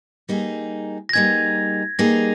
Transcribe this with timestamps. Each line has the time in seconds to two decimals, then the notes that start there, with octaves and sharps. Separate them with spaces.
0.29 G3 A#3 D#4 G#4
1.09 A#6
1.13 G3 A#3 D#4 G#4 G#6
1.99 G3 A#3 D#4 G#4 A#6